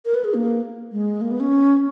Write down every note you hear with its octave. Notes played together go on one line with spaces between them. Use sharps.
A#4
B4
G#4
A#3
G#3
A#3
B3
C#4